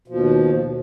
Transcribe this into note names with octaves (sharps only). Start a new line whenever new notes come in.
D#2 B2 F3